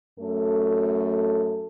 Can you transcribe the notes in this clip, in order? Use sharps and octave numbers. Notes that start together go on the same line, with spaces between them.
F#2 A3 A4